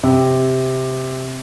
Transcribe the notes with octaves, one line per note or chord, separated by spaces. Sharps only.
C3